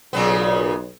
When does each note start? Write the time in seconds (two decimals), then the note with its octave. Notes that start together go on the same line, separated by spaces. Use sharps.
0.13 B1 A#2 C#3 B3